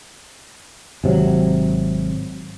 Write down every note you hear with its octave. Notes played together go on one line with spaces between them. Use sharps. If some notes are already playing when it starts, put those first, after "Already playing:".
G#1 C3 F#3